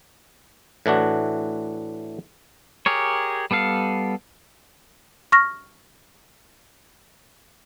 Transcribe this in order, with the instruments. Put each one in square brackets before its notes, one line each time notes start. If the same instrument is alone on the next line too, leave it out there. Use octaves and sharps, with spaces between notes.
[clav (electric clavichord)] A2 E3 D4 F#4
[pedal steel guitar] G4 G#4 A#4 C#5
G3 B3 A4 F5
[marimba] C#6 F6 A#6